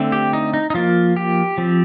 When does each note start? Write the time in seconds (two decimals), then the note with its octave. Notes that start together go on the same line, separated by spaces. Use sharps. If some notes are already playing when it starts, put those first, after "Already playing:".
Already playing: D3 A3 C4
0.12 G4
0.33 D#4
0.54 D#4
0.70 D#4
0.74 F3 A#3 F4
1.16 G4
1.58 F3 C4